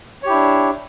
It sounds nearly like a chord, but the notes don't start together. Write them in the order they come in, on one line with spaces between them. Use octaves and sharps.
C#5 G4 E4 D4